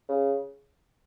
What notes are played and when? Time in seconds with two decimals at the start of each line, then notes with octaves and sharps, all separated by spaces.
0.08 C#3